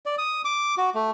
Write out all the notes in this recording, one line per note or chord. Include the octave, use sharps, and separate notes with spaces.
D5
D#6
D6
F#4
A3